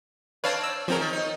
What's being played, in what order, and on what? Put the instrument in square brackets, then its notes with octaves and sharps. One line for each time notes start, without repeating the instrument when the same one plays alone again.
[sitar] C4 D4 C#5 [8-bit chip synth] B4 F5 A5
[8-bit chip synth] E6
[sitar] C#3 C#4 [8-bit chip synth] F3 C4 A#4
[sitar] D#3
D#4